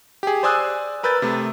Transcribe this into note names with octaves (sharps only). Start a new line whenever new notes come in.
G4 G#4
C5 D5 G#5 D#6 E6 F#6
A#4 B4 E6 G6 A6
C3 A3